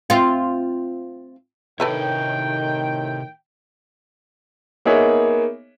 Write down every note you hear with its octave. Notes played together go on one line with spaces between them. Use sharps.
C4 F4
A2 C3 D#3 A4 B4 C#5 E5 G5
A#3 B3 D#4 G#4 C#5 E5